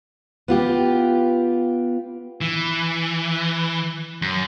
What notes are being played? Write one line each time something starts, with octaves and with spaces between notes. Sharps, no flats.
B3 F4 G4
E3
F#2